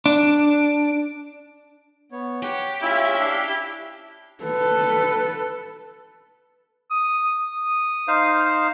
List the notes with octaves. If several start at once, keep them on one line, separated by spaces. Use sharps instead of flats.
D4
B3 C#5
G4 C#5 F#5
C#4 E4 F4 C#5 E5
D4 F5
A4 B4
D#6
D#4 C5 F5